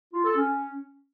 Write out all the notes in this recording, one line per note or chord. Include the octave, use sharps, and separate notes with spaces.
F4
A4
C#4